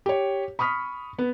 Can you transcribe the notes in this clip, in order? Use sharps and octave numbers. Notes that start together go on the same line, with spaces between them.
G4 C#5
B5 C#6 D#6 F6 B6
B3